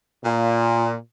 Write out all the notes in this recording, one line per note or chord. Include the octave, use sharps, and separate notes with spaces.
A#2